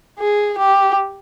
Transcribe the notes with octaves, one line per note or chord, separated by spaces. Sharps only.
G#4
G4